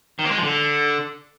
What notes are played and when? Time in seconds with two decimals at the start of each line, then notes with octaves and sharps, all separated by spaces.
0.19 D#3
0.25 A#3
0.31 G#3
0.37 F3
0.43 D3